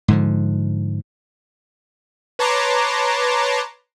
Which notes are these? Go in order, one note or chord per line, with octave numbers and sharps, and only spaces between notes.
G#2 D3 F3
B4 C#5 A5 A#5 C6 D6